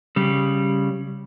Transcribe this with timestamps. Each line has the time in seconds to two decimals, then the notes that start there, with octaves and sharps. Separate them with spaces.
0.16 C#3 G3